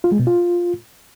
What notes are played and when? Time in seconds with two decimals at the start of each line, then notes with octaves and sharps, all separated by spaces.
0.04 F4
0.12 G#3
0.19 B2
0.27 F4